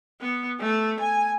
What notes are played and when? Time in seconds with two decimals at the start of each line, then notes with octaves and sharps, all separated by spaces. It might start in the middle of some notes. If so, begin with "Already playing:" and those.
0.21 B3
0.60 A3
1.00 G#5